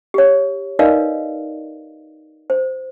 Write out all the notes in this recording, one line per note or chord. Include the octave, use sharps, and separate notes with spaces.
G4 C#5
D#4 A#4 B4 D5 D#5 F5
C5